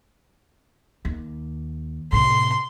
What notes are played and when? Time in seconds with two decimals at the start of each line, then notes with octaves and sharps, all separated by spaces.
1.05 D#2
2.12 A2 C3 C6